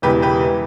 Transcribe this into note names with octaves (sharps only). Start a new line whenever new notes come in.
E1 E2 C#3 E3 G4 B4
G4 B4
E3